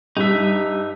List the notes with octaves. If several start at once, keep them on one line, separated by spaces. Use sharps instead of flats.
G2 D#4 E5